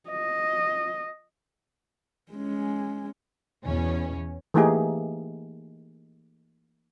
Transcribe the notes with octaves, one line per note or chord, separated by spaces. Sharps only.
D#5
G#3 C#4
E2 B2 C#4
E3 A3 A#3 D#4 G4 G#4